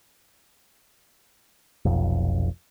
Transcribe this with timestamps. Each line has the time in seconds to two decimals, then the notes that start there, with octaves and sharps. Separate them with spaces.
1.85 F1 B1 F2